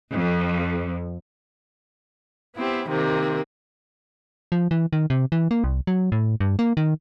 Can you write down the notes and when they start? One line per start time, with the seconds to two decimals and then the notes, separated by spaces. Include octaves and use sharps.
0.13 F2
2.56 B3 C4 E4 G4
2.88 C3 D#3 A#3 C4
4.52 F3
4.71 E3
4.93 D#3
5.10 C3
5.32 E3
5.51 A#3
5.64 C2
5.87 F#3
6.12 A2
6.40 G2
6.59 A#3
6.77 D#3